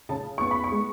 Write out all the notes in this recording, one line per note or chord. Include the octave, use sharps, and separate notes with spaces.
C#3 A5
B3 C#6
B5
C#6
G#3